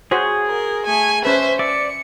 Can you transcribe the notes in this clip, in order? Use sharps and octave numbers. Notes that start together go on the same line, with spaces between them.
F#4 G#4 C5 C#5
A#4
A3 G#5
C#4 B4 C5 E5
D5 E5 C#7